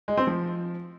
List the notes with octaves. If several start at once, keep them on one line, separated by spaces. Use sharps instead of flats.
G#3
C4
F3